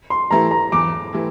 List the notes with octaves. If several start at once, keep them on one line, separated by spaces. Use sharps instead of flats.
C6
E3 A3 E4 G4 A#5
A#5
E2 D6
E3 A3 E4 G4